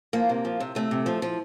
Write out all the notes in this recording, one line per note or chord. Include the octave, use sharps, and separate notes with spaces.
F3 A#3
C3
F3
C3
C3 A3
C3
F3
F3